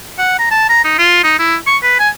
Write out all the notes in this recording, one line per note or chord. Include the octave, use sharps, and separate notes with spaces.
F#5
A#5
A5
A#5
D#4
F4
D#4
E4
C#6
B4
G#5